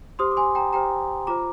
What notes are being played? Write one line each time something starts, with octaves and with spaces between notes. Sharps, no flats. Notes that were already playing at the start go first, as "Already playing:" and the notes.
G4 C5 C6 D#6
D6
G#5 C6
G5 A#5
G4 C5 G5 A#5
F4 C5 A#5 D6